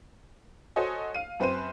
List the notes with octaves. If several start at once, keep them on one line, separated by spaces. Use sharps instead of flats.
F#4 A4 C5 C#5 D#5 G#5
F5 D#7
F#2 C4 B4 C5 D#7